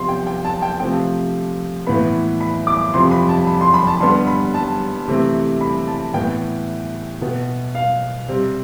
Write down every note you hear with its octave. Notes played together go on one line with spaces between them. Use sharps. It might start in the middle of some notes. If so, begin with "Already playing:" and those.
Already playing: C3 F3 B3 C6
G5
G5
A5
G5
C3 F3 A3 C4 G5
A2 E3 B3 B5
B5
D6
F2 C3 F3 C6
B5
A5
B5
C6
B5
A5
G2 D3 G3 B3 C6
B5
A5
C3 E3 A3 C4
B5
A5
A2 E3 B3 G5
B2 B3
F5
C3 G3 C4